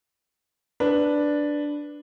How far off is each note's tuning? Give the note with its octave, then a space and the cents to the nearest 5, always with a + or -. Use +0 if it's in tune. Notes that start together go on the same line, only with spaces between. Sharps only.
D4 +0 B4 +0